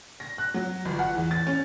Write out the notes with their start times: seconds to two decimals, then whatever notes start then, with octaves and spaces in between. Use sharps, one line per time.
0.20 A#6
0.38 F#6
0.54 F#3
0.85 G1
0.99 F#5
1.15 E2
1.31 A6
1.47 C#4